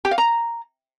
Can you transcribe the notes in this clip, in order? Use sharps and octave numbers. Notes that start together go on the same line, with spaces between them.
G4
F5
A#5